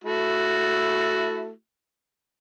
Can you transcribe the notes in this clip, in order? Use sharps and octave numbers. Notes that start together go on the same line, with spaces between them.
A3 E4 F#4